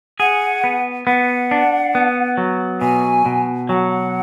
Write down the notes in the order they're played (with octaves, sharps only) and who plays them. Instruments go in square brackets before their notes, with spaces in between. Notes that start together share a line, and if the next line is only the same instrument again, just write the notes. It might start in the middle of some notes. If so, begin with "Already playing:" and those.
[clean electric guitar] G#4 [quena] F#5
[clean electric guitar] B3
[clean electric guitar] B3 [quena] F#5
[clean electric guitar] D4
B3
F#3
[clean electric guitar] B2 [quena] G#5
[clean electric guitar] B2
[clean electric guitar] F#3 [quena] F#5 G#5